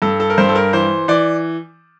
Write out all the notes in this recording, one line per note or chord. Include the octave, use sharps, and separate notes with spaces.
G2 A4
A4
A#4
G2 C5
A4
A#4
E3 C5
E3 D5